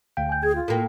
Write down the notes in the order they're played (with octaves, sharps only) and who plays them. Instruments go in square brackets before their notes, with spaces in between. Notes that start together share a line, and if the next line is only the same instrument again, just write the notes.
[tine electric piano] D2 G5 [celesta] F5
[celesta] G#5 G6
[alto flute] G#4 [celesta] G#6
[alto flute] F4
[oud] A2 A#3 [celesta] A4 G5